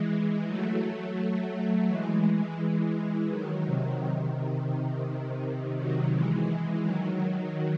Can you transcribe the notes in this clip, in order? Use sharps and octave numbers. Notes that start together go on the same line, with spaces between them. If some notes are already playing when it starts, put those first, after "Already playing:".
Already playing: E3 G#3
F#3 A3
F#3 A3
E3 G#3
E3 G#3
E3 G#3
D#3 F#3
C3 D#3
C3 D#3
C3 D#3
D#3 F#3
E3 G#3
E3 G#3
D#3 F#3